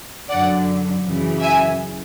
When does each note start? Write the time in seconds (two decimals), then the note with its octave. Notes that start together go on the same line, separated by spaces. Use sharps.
0.30 F#2 D3 F#3 D5 F#5
1.04 F#2 C#3 E3
1.41 E5 G#5